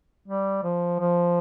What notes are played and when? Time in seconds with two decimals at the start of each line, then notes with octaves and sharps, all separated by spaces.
0.28 G3
0.63 F3
1.00 F3